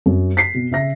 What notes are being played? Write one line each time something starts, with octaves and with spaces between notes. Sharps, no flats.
F#2
B6 C7
B2
C#3 E5 A#6